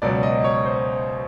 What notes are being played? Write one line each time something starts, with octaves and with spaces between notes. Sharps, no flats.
C#2 B2 F#3 D5
D#5
C#5
C5